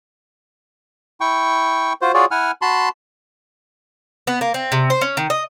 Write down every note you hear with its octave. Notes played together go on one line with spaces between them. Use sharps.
E4 G5 C#6
F4 F#4 C5
F4 F#4 G#4 C#5 D5
E4 F#5 G#5 F6
F#4 A5 B5 C6
B3
A#3
C4
C3
C5
C#4
D#3
D#5